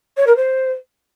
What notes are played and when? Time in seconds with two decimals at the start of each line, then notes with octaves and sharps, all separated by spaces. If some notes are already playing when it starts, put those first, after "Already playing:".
0.17 C#5
0.27 A#4
0.36 C5